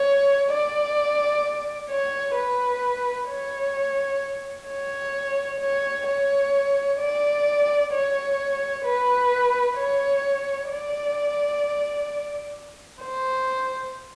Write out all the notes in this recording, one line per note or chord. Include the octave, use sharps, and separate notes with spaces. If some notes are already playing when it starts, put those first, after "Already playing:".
Already playing: C#5
D5
C#5
B4
C#5
C#5
C#5
C#5
D5
C#5
B4
C#5
D5
C5